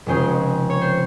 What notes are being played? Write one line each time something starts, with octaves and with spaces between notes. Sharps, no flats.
F1 F2 C#3 G#3 C#4 C5
C#5
C5